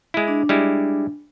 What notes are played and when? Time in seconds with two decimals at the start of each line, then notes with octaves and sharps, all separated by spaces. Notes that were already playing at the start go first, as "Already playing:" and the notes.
0.14 G#3 E4
0.28 D4
0.49 G3 G#3 E4